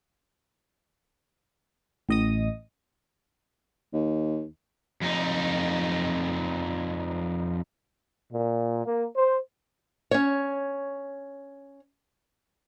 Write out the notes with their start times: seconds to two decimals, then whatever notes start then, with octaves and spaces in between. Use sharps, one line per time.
2.09 A1 D#5 D#6
3.93 D#2
5.02 F2 D#4
8.32 A#2
8.85 A#3
9.16 C5
10.11 C#4 C#5